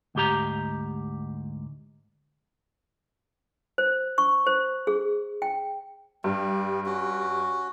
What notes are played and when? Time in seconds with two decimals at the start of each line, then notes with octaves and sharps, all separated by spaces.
0.15 D2 G#2 G4 A#5
3.78 C5
4.18 C#6
4.47 C5
4.87 G#4
5.42 G5
6.24 G2 G3
6.86 C#4 F#4